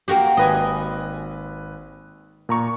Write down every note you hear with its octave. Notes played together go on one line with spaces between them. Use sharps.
A#3 F#4 G4
G#1 B4 D#5 G#5
A#2 A#5 C#6